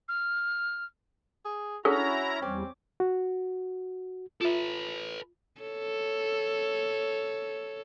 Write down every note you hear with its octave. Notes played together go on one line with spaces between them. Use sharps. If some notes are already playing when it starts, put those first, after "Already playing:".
F6
G#4
C#4 D4 E4 F#4 G#4 A4 A#5
E2 G3 C4 D6
F#4
F4 A4 B4 E5
A4 C#5